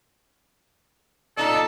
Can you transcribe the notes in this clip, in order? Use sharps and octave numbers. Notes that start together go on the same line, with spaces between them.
A#2 D#4 A4 D5